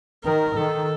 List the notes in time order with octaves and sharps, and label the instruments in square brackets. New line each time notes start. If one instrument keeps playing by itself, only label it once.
[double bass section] D#3 [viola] A#4
[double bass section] D#3 [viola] A4